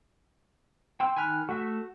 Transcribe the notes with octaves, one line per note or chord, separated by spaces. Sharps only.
G5 C6 E6
D#3 G#5 B5 F6 F#6
A3 F#4 E5